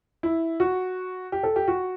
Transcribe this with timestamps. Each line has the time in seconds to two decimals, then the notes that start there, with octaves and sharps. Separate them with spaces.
0.23 E4
0.60 F#4
1.32 G4
1.43 A4
1.56 G4
1.68 F#4